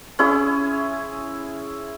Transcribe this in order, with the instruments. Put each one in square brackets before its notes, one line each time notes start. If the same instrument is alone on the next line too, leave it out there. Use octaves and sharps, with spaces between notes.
[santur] C#4 E4 G#4